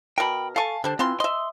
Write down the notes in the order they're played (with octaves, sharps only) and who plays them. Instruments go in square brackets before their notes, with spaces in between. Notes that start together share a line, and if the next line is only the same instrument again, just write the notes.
[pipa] B2 A#4 [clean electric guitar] G5 B5
[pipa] A4 C#6 [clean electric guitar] F5 G#5 A5
[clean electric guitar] D3 C5 [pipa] G3 D4
[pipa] E3 F4 C6 [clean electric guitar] C4
[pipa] D#5 E5 [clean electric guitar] C6